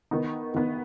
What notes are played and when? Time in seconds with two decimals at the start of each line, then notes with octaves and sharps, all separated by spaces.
0.11 D#3 B3 D#4
0.54 D#3 B3 D#4